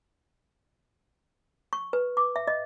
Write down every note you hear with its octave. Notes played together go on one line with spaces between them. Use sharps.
C#6
B4
D6
E5
D#5